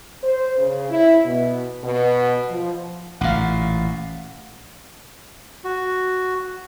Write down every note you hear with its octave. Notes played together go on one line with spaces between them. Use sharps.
C5
C#3
E4
B2
B2
F3
A1 A#2 F5 F#5
F#4